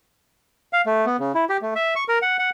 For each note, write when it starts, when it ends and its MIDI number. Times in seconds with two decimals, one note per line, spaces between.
0.73 0.81 77
0.86 1.05 57
1.06 1.17 59
1.20 1.32 49
1.35 1.45 64
1.49 1.57 67
1.62 1.74 57
1.76 1.94 76
1.96 2.04 85
2.08 2.19 70
2.22 2.37 78
2.39 2.50 78